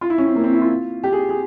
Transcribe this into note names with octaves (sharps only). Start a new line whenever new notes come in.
F4
E4
C#4
C4
A#3
C4
E4
F4
G4
G#4
G#4